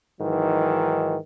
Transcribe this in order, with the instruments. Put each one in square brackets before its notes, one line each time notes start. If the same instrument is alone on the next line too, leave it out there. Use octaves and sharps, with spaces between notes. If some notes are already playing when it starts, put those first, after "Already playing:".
[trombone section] G#2 D#3 E3 F#3